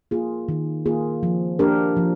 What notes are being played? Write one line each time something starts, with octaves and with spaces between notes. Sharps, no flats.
A#3 F4 G#4
D#3
A#3 F4 G#4
F3
A#3 D4 G4 A#4
F3